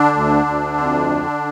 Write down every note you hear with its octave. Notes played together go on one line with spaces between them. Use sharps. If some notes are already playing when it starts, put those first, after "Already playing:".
Already playing: D3 D4
D2
D2
F2
D3